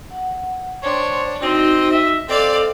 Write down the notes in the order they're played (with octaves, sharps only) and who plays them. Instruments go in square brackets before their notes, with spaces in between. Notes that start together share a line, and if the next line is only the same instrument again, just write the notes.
[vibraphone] F#5
[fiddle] D4 [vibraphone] C5 G5 C6 [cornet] C#5
[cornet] C4 [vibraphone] D#4 F#4 [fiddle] D#5
[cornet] E5
[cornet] C4 [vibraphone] A4 D#5 [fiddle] D5 F5